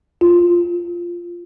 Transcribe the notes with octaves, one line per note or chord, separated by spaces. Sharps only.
F4